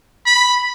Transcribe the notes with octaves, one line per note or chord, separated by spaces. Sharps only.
B5